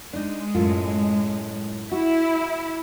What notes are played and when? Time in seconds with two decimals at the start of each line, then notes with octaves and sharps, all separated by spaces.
0.13 G#3 D4 D#4
0.55 F#2 A2 F4
1.92 E4 F#4